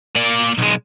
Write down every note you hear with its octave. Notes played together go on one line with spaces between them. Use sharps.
A#3 D5
B1 G#3